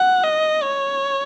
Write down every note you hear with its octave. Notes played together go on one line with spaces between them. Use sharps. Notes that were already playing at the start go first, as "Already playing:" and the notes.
Already playing: F#5
D#5
C#5